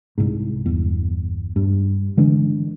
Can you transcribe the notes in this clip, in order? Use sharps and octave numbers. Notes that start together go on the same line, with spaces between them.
C2 G#2
G1 E2
G2
D3 E3 G#3 D4